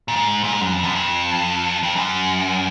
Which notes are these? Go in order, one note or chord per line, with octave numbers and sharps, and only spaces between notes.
A#2
G#2
A#2
G#2
F#2
F2
F#2
F2
F2
F#2